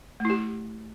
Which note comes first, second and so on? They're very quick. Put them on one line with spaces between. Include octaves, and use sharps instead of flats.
A3 E4 G4